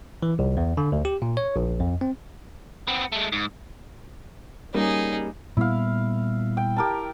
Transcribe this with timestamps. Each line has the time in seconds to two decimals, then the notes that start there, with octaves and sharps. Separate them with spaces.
0.23 E3
0.39 C2
0.57 E2
0.77 D3
0.92 D2
1.05 G4
1.22 A#2
1.37 C#5
1.56 A#1
1.80 F2
2.01 C4
2.88 B3 C4
3.12 G#3 A3
3.32 G#2
4.74 G3 A#3 C#4 D#4 G#4
5.57 A#2 G3 B3 E4 F5
6.57 G5
6.76 G4 A#4 A5